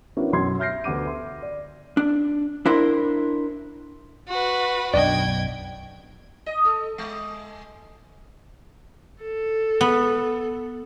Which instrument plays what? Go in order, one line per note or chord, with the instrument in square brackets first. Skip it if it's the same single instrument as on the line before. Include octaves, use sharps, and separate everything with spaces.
[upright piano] B3 C#4 D4 E4 F#4 A#4
B1 F#2 C6 G#6
E5 F6 G6 A#6 C7
D2 B3 F#5 D6 D#7
E5 C6
D5
[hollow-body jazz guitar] D4
D4 E4 A#4 C5
[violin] F#4 B4
[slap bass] B1 F#2 [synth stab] D4 D#5 [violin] G5 G#6
[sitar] D#5
A4
G#3
[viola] A4
[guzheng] B3